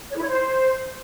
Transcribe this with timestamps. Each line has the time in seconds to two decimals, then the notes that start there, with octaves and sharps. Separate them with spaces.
0.10 C#5
0.16 E4
0.22 C#5
0.28 C5